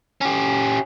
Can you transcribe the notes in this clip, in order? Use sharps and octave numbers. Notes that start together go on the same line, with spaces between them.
C#4 G4